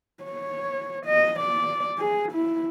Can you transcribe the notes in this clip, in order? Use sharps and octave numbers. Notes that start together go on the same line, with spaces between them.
C#5
D#5
D5
G#4
E4